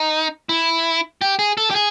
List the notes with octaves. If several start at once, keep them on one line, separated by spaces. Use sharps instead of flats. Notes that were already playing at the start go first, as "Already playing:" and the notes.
Already playing: D#4
E4
G4
G#4
A4
G4
G#4